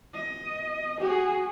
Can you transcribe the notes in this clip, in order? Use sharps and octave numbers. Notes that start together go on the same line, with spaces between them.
D#5
F#4 G#4